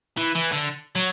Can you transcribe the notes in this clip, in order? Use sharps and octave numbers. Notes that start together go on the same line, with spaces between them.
E3
E3
D3
F#3